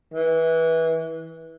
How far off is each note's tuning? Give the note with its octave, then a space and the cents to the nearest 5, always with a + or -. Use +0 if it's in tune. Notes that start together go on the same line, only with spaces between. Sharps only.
E3 -20